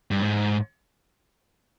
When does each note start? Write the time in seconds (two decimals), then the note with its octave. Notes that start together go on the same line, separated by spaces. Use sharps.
0.11 G2
0.22 G#2